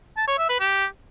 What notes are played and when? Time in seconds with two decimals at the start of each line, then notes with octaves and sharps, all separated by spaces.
0.17 A5
0.28 C#5
0.38 E5
0.49 B4
0.60 G4